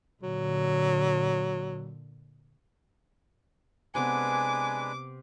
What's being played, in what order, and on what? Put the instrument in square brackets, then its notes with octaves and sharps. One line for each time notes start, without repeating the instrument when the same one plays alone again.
[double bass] A#2 D3 [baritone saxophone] F#3
[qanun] C3 B3 A#4 [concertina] G#3 D4 B4 [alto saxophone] G#5 [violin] D6